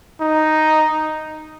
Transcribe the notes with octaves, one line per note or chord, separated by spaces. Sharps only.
D#4